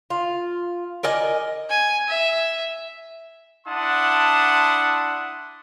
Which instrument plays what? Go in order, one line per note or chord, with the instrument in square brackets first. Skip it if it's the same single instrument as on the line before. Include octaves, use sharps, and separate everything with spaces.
[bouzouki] F4
A#4 D5 D#5 G#5
[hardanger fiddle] G#5
E5
[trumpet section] D4 E4 F#5 A5 C6 D#6